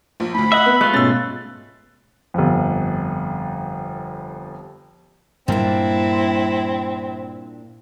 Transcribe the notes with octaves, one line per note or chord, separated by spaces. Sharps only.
A#1
D2 A2 B5
D#5 E5 F#5
B3
G#3 A3 F4 F#6
G#2 B2 C#4 E6 A6
G1 F2
G2 A#2 G3 A#3 C4 D4 E4